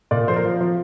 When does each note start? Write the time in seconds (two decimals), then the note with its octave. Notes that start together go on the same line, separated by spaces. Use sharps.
0.11 A#2 D5
0.28 F3 C5
0.36 A#4
0.45 F3
0.61 F3